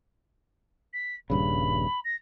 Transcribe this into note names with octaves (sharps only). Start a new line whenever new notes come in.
B6
D#1 G2 C#3 B5
A#6